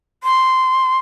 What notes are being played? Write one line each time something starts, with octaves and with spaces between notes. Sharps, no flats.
C6